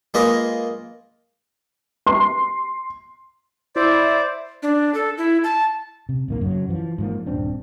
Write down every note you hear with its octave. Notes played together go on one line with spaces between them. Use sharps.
G#3 A#3 F4 G#4 B4 D#5
C6
E4 C5 D5
D4
A4
E4
A5
C3
D1 D#3 A#3
F#2 C#3 F#3
E3 F3
G#2 F3 A#3
D#1 G2 C4 D4